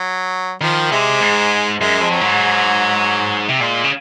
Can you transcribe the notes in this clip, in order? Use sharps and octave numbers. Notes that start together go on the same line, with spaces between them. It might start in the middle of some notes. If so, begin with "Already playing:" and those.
Already playing: F#3
D#3 F3
C3 G#3
G#2
F#2 G#3
F2
F#3
G#2
C3
A#2 G#3
C#3